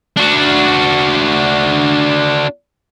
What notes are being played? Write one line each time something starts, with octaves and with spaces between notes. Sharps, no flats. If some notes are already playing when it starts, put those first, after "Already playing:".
D4 F#4